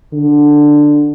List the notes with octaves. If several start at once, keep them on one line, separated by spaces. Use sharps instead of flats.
D3